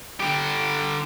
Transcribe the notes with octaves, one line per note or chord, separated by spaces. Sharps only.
D3 G4